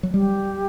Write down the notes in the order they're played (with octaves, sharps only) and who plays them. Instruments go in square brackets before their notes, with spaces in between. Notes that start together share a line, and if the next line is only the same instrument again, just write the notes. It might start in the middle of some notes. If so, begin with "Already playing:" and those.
[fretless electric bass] F#3
[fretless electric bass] G3 [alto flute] G4